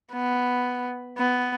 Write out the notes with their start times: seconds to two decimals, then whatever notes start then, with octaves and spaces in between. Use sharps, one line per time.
0.13 B3
1.17 B3